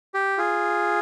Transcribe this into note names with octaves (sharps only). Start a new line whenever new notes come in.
G4
F4 G#4